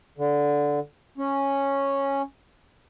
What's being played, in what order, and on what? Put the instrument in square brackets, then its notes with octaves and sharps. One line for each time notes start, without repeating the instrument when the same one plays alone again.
[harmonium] D3
C#4